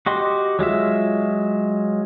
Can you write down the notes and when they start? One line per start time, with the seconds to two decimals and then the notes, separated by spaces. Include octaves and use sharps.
0.06 F#4 G4 D#5 C6
0.59 F#3 G#3 F4 E5